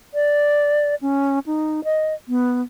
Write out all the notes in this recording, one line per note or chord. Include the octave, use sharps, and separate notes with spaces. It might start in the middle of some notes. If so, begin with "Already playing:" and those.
D5
C#4
D#4
D#5
B3